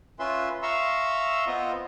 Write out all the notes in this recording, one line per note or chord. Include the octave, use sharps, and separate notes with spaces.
C#4 F4 B4 E5 C6
E5 F5 A#5 C6 C#6 E6
B3 C4 F4 D#5